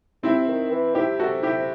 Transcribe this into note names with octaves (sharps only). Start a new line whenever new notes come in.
C3 C4 E4
D#3
E3
C3 E4 G4
F#4 A4
E4 G4